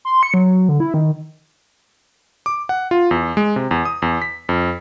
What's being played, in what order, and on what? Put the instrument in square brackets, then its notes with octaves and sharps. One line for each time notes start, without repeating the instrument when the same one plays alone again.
[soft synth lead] C6
C#7
F#3
D3
E4
D#3
[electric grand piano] D6
F#5
F4
E2
G#3
C3
E2
D#6
E2
B6
F2